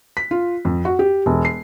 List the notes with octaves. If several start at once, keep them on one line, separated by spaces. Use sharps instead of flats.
B6
F4
F2
F#4
G4
E1
C7